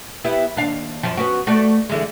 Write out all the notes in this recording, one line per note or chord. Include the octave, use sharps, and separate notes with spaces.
B3 E4 G4
D#2 D4 F5
F#2 F3
B3 C#4 F#4
A3 F#4 D5
D3 E3 G#3